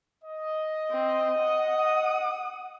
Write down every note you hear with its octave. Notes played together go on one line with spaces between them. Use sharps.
D#5
C4
F#5 D#6